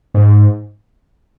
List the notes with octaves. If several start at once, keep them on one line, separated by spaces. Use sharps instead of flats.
G#2